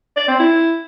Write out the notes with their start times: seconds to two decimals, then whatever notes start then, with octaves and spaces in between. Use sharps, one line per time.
0.17 D5
0.28 C4
0.40 E4